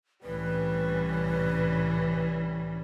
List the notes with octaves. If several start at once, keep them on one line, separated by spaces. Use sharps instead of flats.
C2 A2 E3 G3 C#4 B4